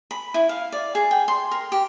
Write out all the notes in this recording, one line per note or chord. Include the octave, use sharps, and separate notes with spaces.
B5
E4
F5
D5
G#4
G5
C6
A#4
G4